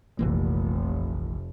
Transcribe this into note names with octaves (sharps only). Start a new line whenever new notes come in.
F1 A#1 E3 A#3